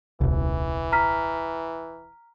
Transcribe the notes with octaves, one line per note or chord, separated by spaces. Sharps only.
D#1 C2 E3
A#5 F6 B6